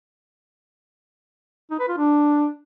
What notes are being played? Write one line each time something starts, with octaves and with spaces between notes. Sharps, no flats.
D#4
B4
F4
D4